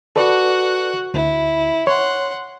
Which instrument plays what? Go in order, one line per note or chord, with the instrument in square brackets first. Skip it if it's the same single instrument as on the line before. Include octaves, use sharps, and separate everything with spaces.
[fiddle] F#4 F#5 [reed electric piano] A4 B4 D5
[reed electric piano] D2 [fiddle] E4
[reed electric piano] C#5 [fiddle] F#5 C6